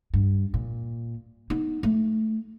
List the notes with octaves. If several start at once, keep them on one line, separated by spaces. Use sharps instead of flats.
G2
A#2
B3 D#4
A3